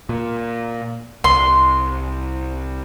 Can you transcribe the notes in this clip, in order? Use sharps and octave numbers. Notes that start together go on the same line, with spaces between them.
A#2
C2 C6